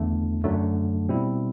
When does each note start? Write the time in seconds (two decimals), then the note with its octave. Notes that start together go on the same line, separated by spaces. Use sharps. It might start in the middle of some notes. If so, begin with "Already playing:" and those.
Already playing: E2 D3 A3
0.44 F#2 D3 F#3 A3
1.09 B2 G3 C4 E4